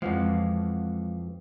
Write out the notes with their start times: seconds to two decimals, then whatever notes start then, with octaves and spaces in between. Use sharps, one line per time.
0.02 F2 E3 F3 G#3 F5 F#5